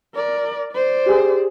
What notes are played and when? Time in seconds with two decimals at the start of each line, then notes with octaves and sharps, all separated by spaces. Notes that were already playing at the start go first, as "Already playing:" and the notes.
0.16 A#4 D5
0.74 C5 D5
1.06 G4 G#4